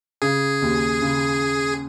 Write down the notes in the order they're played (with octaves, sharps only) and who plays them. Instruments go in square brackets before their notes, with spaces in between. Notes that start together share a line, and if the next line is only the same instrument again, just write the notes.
[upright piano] C#3 [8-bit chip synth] G#4
[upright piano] D#2
C#3